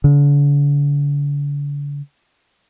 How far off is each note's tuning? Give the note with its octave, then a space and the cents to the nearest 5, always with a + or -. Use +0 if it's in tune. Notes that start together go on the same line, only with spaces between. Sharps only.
D3 -40